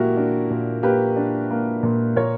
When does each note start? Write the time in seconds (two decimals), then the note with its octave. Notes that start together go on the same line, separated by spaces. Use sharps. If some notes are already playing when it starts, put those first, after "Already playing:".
Already playing: A#2 A#3 E4 F#4 G4 A#4
0.17 D4
0.50 A#2
0.83 A#3 G4 B4
1.16 D4
1.51 A#3
1.83 A#2
2.16 A#2 A#4 C#5